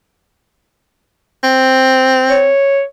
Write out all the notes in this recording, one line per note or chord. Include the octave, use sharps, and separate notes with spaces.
C4
C#5